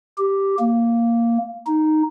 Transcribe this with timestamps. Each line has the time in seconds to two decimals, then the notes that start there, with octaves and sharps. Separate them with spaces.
0.18 G4
0.59 A#3
1.66 D#4